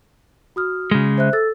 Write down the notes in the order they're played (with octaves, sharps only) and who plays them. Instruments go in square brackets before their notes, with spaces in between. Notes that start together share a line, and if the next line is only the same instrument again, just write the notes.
[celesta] F#4 D#6 F6
[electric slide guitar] C#3 G#3
[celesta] C5 E5 F#6
A4 E6 A6